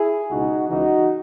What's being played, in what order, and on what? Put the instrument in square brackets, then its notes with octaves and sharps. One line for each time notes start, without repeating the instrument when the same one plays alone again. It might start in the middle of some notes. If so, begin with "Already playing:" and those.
Already playing: [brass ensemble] E4 G#4
C#2 B2 D#4 F#4
C#2 C#3 E3 D#4 F#4